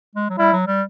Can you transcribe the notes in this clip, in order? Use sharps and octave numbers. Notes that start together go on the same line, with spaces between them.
G#3
F#3
G3 E4
F#3
G3